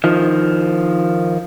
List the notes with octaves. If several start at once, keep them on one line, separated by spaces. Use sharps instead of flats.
D#3 F3